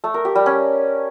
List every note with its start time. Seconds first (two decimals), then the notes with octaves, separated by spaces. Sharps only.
0.04 A3
0.14 A#4
0.25 G4
0.35 G3
0.46 C#4